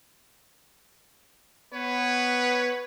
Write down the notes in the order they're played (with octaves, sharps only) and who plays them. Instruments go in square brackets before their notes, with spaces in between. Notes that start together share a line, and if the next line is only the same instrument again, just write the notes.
[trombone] B3 [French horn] B4 [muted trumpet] C#5